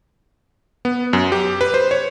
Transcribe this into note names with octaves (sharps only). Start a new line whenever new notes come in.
B3
F#2
G4
B4
C5
C#5